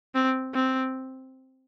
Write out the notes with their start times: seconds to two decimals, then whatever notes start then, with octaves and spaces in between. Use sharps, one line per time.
0.15 C4
0.55 C4